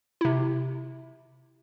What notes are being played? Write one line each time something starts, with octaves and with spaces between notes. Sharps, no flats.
C3 E4